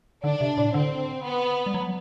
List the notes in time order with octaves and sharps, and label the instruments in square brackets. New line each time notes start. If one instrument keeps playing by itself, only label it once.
[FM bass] D3 [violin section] D4
[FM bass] C3
A2
[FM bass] D3 [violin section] C4
[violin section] B3
[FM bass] G3
F#3